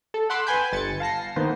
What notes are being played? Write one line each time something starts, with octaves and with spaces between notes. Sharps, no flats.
A4
F#5 B5 C6 D6 E6 F#6
B4 G5 G#5 B5 G6
G1 A6 C#7
F5 A5 A#6 C7
D#3 A#3 B3 C5